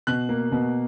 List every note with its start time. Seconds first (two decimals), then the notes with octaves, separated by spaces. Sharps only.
0.07 B2 F#6
0.29 A#3
0.52 B2